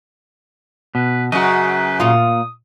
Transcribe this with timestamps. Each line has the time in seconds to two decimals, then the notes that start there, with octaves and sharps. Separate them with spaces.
0.95 B2 B4
1.32 F#2 C#3 F#4 B4 D#5
2.00 A#2 F4 D#6